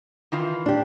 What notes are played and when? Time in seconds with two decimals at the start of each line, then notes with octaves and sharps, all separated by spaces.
0.32 D#3 E3 F4
0.66 D4 G4